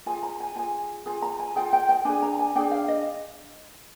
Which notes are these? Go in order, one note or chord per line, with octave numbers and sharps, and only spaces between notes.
F4 G#4 G#5
A#5
G#5
F4 G#4 G#5
F4 G#4 G#5
A#5
G#5
F4 G#4 G5
G5
G5
D4 G#4 G#5
A#5
G#5
D4 G#4 G5
F5
D#5